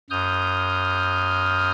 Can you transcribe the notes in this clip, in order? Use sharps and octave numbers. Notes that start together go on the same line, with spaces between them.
F#2 D#6 F6 G6